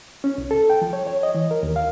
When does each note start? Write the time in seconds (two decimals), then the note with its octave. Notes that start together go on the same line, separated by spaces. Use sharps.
0.24 C#4
0.38 C2
0.51 A4
0.70 G5
0.82 F3
0.93 C#5
1.07 C#5
1.23 D#5
1.35 E3
1.51 A#4
1.63 D#2
1.76 F5